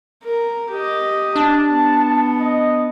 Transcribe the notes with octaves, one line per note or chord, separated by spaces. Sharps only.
A#4
G4 D#5
D4 A5
B3
D#5